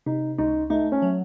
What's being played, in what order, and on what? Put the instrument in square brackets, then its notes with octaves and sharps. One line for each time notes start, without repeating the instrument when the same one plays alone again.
[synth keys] C3 [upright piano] D#4
[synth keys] C#2 [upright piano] D#4
[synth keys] A3 [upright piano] D#4
[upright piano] C#4
[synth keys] F#3